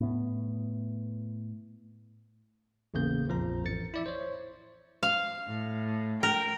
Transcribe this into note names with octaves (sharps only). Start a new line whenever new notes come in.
A2 B3
A1 E2 C#3 A#3 G6
A#1 F2 F3 A#5
A1 A6 C#7
E4 D5 E5
C5 C#5
F5
A2
A#4 G5